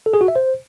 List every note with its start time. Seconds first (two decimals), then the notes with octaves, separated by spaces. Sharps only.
0.06 A4
0.14 G#4
0.21 F#4
0.28 E5
0.36 C5